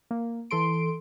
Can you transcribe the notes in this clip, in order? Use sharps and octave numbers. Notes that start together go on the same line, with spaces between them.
A#3
E3 A4 C6 D7